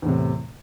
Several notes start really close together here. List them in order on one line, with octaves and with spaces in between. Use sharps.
E2 A2 C3